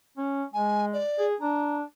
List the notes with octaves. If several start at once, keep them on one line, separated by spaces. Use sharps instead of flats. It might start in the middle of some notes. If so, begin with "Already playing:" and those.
C#4
G#3 G#5
D5
G#4
D4 A#5